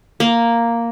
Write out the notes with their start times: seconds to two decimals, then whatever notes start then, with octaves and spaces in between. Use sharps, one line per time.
0.20 A#3